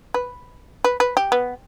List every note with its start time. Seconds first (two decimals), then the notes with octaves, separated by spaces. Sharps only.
0.14 B4
0.84 B4
1.00 B4
1.17 G4
1.32 B3